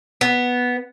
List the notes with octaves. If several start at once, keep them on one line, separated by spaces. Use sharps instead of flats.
B3